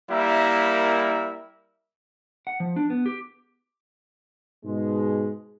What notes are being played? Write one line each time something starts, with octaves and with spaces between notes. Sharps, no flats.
G3 A#3 E4 A#4 E5
F#5
F3
D4
B3
G4
G#2 B2 G#3